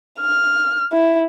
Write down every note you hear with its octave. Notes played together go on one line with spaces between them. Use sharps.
F6
E4